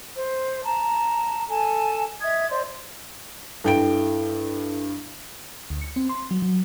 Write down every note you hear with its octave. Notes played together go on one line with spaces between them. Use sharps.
C5
A5 A#5
A4 G#5 A5
D#5 E5 D#6 G#6
C5 D5 D#5 C6
G2 E4 A4 G5 D7
D2
C#7
C4
C6
F#3
F#3